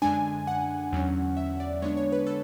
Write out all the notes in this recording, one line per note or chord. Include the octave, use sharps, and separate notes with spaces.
F#2 D3 G#3 D4 G#5
F#5
E2 D3 F#3 C#4
E5
D5
D3 G#3 B3 D4 C#5
C#5
B4
A4